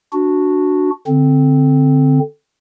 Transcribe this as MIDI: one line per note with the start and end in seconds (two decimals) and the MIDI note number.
0.13 0.90 62
0.13 0.90 66
1.07 2.19 50
1.07 2.19 60